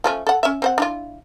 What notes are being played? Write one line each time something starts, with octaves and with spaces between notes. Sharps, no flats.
F3 A3 C#4
A4 F#5
C#4 E5
C4 C5 F#5
D4 E4 F4